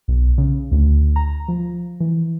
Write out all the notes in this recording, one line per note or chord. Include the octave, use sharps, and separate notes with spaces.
B1
C#3
D2
A#5
F3
E3